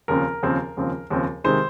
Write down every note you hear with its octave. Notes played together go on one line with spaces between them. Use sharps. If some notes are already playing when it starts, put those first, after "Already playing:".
D#2 C#3 F3 C4 A#4
D#2 C#3 F3 C4
D#2 C#3 F3 C4
D#2 C#3 F3 C4
C3 D#3 G#3 C5